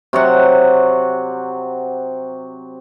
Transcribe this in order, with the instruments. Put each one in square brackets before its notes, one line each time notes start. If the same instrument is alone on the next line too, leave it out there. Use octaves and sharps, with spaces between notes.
[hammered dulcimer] C3 F#3 F#5